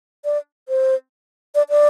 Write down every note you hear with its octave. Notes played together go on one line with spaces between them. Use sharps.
D5
C5
D5
D5